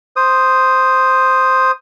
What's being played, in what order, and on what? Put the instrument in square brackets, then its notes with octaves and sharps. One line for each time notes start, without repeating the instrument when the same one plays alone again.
[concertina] C5 D#6